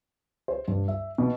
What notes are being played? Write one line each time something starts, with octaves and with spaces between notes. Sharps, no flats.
C5
G2
E5
B2